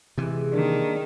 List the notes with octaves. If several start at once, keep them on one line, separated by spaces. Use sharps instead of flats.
C3 E3 G#3 E4
D#3 A#3 D4